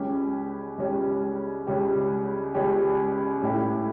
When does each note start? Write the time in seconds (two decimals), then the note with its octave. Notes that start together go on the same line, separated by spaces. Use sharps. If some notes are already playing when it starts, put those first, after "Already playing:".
Already playing: C#2 C#3 G3 C#4 G4
0.78 C#2 C#3 G3 C#4 G4
1.67 C#2 C#3 G3 C#4 G4
2.54 C#2 C#3 G3 C#4 G4
3.42 A2 G3 C#4 E4 G4